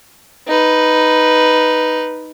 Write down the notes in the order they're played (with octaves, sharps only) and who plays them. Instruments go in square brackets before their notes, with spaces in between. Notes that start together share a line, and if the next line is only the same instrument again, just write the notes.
[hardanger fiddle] D#4 B4